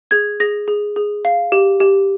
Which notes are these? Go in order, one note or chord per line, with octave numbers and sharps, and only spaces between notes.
G#4 G#6
G#4 A#6
G#4
G#4
F5
G4
G4